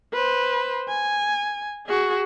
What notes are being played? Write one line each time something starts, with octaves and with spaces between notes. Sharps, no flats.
B4 C5
G#5
F#4 G#4